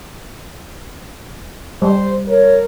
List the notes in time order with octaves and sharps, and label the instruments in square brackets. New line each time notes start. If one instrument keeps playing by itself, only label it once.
[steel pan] G3 [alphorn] C5
[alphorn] A#4 [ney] C#5